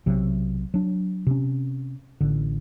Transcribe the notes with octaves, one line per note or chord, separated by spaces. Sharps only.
B1 C3 F#3
F#3 D4
C3 C#4
A1 D3